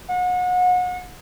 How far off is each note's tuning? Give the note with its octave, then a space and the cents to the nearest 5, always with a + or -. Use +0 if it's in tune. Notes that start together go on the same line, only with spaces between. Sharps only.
F#5 -35